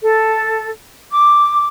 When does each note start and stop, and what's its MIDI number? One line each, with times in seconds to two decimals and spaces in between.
0.03 0.69 69
1.12 1.67 86